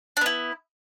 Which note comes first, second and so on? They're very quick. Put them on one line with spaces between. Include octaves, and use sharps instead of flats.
D4 B3 E4